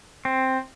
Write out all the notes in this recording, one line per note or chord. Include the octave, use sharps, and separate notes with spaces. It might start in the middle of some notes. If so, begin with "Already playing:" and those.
C4